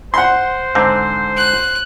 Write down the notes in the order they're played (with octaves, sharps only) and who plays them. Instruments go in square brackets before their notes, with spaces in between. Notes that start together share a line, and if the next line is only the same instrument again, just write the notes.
[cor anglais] C5 [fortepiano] F#5 C6
[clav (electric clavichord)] G#2 D3 C4
[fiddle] F#6